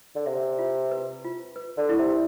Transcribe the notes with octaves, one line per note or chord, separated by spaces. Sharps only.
D3
C3 E5
F4
B4
F4
B4
D3
E4
C3